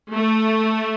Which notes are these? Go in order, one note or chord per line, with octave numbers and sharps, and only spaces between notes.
A3